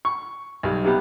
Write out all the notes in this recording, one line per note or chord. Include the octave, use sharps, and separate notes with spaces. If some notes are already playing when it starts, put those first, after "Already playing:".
C#6
B1 G3
C3 G3 B3